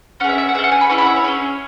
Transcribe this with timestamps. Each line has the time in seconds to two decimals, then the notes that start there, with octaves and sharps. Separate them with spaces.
0.20 C#4 F#5
0.24 G#4 E5
0.38 E5
0.49 F#5
0.55 G#4 E5
0.59 C#4 F#5
0.72 G#5
0.81 B5
0.89 C#4 E4 G#4 C#6
0.98 B5
1.02 F#5
1.06 E5
1.16 C#5
1.24 C#4 E4 G#4